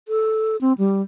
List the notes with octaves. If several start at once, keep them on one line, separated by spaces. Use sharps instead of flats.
A4
C4
G3